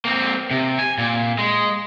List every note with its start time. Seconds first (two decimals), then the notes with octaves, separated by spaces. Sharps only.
0.05 A#3 C4
0.51 C3
0.79 G#5
0.98 A#2
1.38 G#3